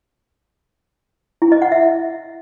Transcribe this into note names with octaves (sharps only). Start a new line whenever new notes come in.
E4
D#5
F#5
E5